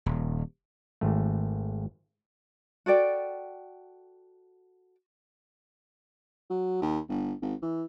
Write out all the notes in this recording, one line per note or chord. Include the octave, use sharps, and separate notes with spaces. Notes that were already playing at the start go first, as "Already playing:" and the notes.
D#1
G#1 A3
F#4 A4 D5 G5
F#3
D#2
G1
G#1
E3